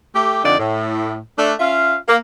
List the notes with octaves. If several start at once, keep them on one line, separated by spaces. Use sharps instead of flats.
A3 G4
F2 D3 D4 D#4 D5
A2
A3 D4
C#4 F4 E5 F5
A#3